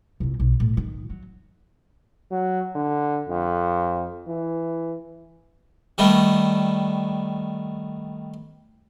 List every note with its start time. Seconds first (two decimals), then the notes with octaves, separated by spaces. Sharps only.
0.20 C2 F2
0.40 B1
0.60 A2
0.77 D#3
1.09 F#3
2.31 F#3
2.75 D3
3.29 F2
4.28 E3
5.98 D#3 G3 A3 B3